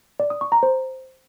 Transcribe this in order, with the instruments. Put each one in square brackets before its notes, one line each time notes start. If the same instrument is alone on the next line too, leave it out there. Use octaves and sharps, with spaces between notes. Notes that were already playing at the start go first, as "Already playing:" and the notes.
[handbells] D5
D#6
C#6
A#5
C5